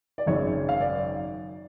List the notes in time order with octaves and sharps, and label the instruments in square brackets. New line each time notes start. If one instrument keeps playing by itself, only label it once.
[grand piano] D5
G#1 F#2 C#3 G#3 C#5
F5
D5